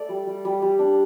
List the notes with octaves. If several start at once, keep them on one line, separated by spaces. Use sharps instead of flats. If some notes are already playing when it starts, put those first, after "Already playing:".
Already playing: A3 D5
G3
G3
G3
G3
D4